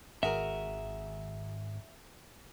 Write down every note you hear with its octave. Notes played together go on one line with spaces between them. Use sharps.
G#1 F#4 G#4 A#4 E5